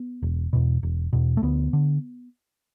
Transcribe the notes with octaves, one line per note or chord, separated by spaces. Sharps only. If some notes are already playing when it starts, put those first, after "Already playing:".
Already playing: B3
E1
E2 B2
E1
E2 B2
A3
D2 B3
D3